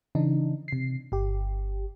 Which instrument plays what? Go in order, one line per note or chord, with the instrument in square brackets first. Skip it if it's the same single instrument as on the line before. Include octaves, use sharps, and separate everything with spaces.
[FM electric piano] C#3 E3 D4 D#4
C3 C7
G1 G4